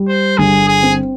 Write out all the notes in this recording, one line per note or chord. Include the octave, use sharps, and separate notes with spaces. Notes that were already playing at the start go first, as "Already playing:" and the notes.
Already playing: G3
C5
G1 G#4
G#4
C4